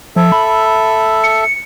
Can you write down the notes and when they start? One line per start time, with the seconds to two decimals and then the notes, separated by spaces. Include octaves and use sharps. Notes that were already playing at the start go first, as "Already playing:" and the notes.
0.16 F3 A4 E5
0.32 B5
1.24 C#7